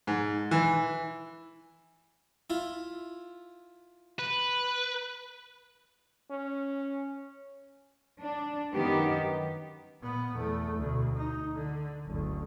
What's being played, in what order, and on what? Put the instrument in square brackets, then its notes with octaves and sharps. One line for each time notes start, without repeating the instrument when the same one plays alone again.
[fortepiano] G#2
E3
[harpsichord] E4 F4
[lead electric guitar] B4
[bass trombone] C#4
[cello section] D4
F#2 D#3 B3 G4
[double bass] A#2 B3
E2 A3
D2 B2
D#4
D3
F#1 D2